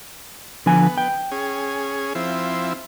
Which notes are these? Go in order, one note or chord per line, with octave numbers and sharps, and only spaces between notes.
D3 F3 B3 G#5
G5
C#4 G#4
F3 C4 E4